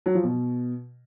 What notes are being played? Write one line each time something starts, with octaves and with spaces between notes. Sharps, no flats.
F#3
F3
B2